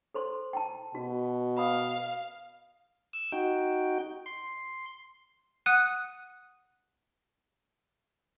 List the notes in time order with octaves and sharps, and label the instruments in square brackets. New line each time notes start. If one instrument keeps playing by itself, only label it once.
[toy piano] A4 C5 C6
G5 A5
[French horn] B2 [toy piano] F#4
[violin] F5 [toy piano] B5 D#6
[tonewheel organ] E6
D#4 F#4 G5
C6
[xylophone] F#5 D#6 F#6 D#7